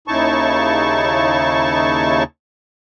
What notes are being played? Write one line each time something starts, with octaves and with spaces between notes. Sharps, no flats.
D#2 C#3 D#4 E4 A5 C#6